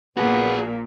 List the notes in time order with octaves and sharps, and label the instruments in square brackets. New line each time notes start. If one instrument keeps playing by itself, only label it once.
[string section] A#1 A#2 [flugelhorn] B3 [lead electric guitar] F#4 G#4